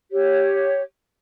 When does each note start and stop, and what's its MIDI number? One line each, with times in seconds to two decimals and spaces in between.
0.11 0.81 67
0.11 0.81 73